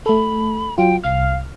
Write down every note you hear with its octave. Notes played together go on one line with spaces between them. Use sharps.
A3 A4 B5
F#3 F4 G5
C2 F5 F6